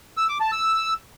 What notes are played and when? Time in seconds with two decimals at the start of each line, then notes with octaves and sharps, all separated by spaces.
0.17 E6
0.29 D6
0.41 A5
0.52 E6